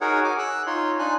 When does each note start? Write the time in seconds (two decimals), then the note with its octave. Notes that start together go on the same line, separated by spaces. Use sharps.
0.01 D#4 F#4 G#4 A#4 C#5 F#5
0.24 G#4 G#5 D6
0.39 E6 F#6
0.67 D#4 F4 C#5 C6
0.99 D4 D#4 G#5 F#6